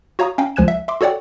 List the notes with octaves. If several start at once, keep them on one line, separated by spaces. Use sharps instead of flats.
F#4 C#5 F5 A#5 C#6 D#6
C#4 F5 G5 A#5
C#2 F3 G#5 F#6 G#6 E7
E5
E5 C6 D6
F#4 A4 C#5 D5 F#5 G5